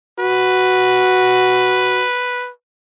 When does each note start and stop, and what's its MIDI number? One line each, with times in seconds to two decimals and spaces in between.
0.19 2.04 66
0.19 2.50 71